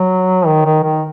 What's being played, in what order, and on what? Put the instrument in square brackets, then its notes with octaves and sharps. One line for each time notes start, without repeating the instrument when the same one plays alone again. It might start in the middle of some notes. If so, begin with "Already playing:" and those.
Already playing: [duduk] F#3
D#3
D#3
D#3